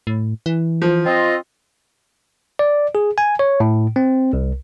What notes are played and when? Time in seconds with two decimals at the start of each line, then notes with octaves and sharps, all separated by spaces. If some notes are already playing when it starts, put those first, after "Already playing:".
0.07 A2
0.46 E3
0.82 F3
1.06 C4 F4 D#5
2.59 D5
2.95 G#4
3.18 G#5
3.39 C#5
3.60 A2
3.96 C4
4.33 C2